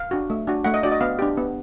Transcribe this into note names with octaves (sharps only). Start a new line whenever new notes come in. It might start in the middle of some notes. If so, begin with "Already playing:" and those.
Already playing: F5
D4 F#4
A3
D4 F#4
A3 F#5
D#5
D4 F#4 D5
D#5
B3 F5
D4 G4
B3